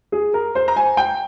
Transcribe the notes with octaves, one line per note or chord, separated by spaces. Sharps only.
G#4
A#4
C5
A#5
G#5
G5